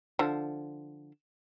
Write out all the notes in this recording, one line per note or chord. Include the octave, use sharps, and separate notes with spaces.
D3 F3